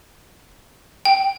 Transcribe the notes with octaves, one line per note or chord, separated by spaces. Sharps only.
G5